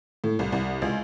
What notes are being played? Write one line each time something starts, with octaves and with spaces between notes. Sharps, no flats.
A2
C2
C2
C#2